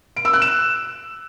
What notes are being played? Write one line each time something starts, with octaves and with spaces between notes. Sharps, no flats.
D7
E6
F#6
E7